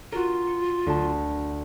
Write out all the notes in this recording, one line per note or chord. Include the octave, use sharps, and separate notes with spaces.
F4 F#4 A#4
C#7
D2 A5